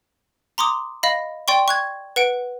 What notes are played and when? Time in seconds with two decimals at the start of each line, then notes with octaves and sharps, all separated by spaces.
0.58 A#5 C6 D6 D#6
1.03 D#5 F5 B5
1.48 D5 G5 C6 C#6
1.68 C#6 F#6 G#6
2.16 B4 F#5 D7